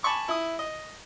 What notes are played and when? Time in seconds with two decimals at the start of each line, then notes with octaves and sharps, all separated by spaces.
0.03 G#5 A5 B5 C#6 D6
0.28 E4 D#6
0.59 D#5